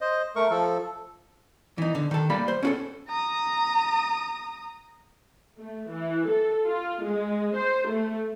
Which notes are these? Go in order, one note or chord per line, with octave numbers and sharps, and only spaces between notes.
C5 D#5
A3 A#4 C#6
F3 A4
E3 D#4
D3
D#3 A4
G3 A#3 B5
C5
C#4 F#4 A4
A#5 D#6
A3
E3
A4
F4
G#3
C5
A3